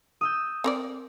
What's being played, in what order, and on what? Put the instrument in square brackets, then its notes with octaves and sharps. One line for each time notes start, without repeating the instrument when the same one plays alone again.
[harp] D#6 E6 G6
[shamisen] C4 A#4 D5